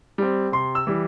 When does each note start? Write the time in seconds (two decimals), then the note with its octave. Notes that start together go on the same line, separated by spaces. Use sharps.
0.18 G3 C4
0.52 C3 C6
0.75 E6
0.87 E3 G3